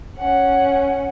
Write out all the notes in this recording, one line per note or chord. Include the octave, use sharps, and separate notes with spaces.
C#4 F#5